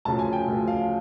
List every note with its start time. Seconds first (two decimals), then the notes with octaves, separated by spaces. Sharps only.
0.05 D2 C#3 F3 A5
0.19 G#5
0.33 G5
0.47 D2 C#3 F3
0.68 F5